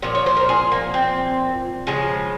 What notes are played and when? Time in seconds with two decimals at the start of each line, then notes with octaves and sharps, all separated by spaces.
0.02 A#2 F3 C#5
0.15 C#5
0.26 C5
0.37 A#4
0.49 G#4
0.72 A#3
0.94 C4
1.87 C#3 F3 G#3